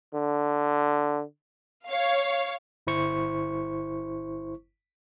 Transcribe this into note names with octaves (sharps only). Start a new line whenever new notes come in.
D3
C#5 F5
G1 E4 C5 C#6